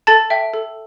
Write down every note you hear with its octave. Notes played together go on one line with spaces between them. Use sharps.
A4 A5 A6
E5 G5
A4